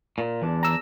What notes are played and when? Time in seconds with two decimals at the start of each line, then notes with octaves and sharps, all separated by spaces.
0.18 A#2
0.42 E2 E3 D4
0.63 A#5 E6